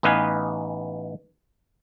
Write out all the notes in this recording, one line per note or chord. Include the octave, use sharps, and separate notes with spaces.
A1 B3 D#4 B4 F5 G#5